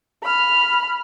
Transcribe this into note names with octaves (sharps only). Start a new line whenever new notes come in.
B5 F6